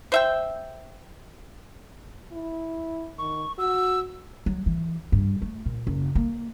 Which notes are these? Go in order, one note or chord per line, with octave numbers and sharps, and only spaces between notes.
C5 E5 G5
E4
D#3 C#6
F#4 E6
F#3
E3
G2
A3
A#2
F#1
A#3